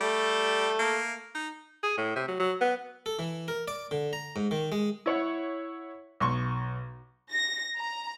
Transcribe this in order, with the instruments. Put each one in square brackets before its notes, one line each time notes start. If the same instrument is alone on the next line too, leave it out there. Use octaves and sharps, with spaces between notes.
[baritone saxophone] G3 [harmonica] A3
[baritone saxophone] A#3
D#4
[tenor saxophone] G#4
A2
C3
F#3
F#3
B3
[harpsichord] A4
E3
A#4
D5
D3
A#5
G#2
D#3
G#3
[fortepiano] E4 C#5 F#5
B1 C6 C#6
[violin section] A#6
A#5